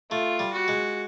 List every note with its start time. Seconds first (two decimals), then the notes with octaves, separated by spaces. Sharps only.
0.11 A3 F4
0.39 G3
0.53 F#4
0.68 G#3